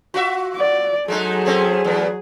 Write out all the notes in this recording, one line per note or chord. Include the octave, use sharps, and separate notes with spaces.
F4 F#4 E5
D5
F#3 G#3 A3 D#4 G#4
A3 C4 C#4
E2 G#2 B3